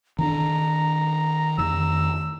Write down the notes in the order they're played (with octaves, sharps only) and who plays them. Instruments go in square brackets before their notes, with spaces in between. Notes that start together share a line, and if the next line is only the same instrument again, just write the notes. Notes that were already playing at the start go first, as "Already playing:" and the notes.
[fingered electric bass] D#3 C#4 D4 [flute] A#5
[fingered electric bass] F2 D#3 [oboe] E6